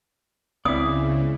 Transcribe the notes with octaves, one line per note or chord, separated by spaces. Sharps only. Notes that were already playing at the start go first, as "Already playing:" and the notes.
C#2 C#3 B3 C4 E4 D5 D#6